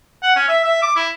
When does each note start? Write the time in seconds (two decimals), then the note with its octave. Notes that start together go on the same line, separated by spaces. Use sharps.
0.23 F#5
0.36 C#4
0.49 E5
0.64 E5
0.83 D6
0.96 E4